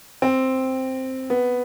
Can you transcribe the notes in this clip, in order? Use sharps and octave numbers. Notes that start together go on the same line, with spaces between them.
C4
B3